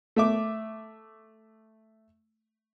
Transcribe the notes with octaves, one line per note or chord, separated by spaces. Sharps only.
A3 E5 D6